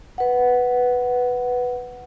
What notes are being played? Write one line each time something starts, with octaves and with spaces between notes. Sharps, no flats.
B4 F#5